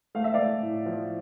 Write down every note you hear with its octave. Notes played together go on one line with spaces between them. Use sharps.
A3 F5
E5
A3 D5 F5
A2
F3